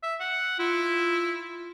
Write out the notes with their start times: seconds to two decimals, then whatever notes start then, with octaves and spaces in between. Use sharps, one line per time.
0.03 E5
0.20 F#5
0.59 E4 F4